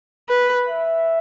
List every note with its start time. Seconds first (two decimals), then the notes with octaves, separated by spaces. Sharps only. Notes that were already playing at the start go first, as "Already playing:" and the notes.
0.29 B4
0.68 E5